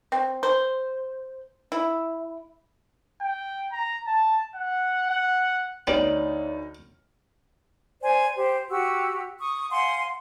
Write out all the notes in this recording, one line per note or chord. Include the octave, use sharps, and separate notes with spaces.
C4
C5
E4
G5
A#5
A5
F#5
F#5
D2 G3 B3 D#4 C#5 D5 F6 F#7
C5 D5 G#5
G4 C5
F#4 G4 E6
C#6 D#6
F5 F#5 G#5 C6